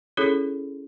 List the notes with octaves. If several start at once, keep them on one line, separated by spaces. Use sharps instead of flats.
C#4 E4 G#4 A4 C#5